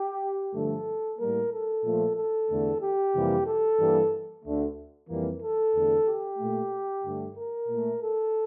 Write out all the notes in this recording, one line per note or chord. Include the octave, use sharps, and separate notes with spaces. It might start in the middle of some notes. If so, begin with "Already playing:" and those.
Already playing: G4
G2 D3 F3 A3 A4
A2 G3 A#3 A#4
A4
A#2 F3 A3
A4
E2 D3 A3
G4
F2 C3 E3 G3 A#3
A4
G2 E3 G3 A#3
D2 D3 A3
F2 E3 G3 A#3
A4
E2 D3 A3
G4
A#2 A3
G2 D3 A3
A#4
A#2 A3
A4